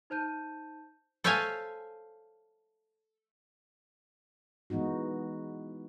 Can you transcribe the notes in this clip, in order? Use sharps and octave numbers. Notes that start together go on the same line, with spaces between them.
D#4 C5 A5 G6 D#7
A4 C5 C#5 E5 F5 G#5
E3 G#3 B3 D#4 F#4